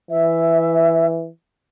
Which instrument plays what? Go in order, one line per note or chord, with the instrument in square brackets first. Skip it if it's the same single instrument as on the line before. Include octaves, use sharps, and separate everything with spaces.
[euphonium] E3 [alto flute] E5